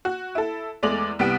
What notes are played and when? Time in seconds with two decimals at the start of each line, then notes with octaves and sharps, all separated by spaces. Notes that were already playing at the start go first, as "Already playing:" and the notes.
0.05 F#4
0.35 E4 A4
0.83 E2 G#3 A3 D5 F7 F#7
1.19 C2 G3 B3 F#5 D7